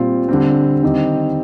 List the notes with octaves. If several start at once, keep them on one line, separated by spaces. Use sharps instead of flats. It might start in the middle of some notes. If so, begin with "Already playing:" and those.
Already playing: A#2 G3 C4 F4
D3 G3 C4
D#3 G3 C4 D#4 G4